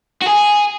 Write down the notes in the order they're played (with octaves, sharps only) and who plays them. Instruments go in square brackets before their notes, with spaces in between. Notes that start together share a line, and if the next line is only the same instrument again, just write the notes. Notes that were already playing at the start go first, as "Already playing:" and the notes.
[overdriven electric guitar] F#4
G#4